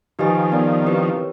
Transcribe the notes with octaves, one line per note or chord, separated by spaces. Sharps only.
D#3 F3 D#4 G4 B4 D#5 G#5
B3 D#4 G4 A#4 D5
C4 E4 G4 B4
A#4 C#5